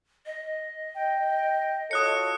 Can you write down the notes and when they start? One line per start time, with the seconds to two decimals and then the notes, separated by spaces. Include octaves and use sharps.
0.26 D#5
0.95 G5
1.91 F4 F#4 A4 C#5 D#6 F#6 C#7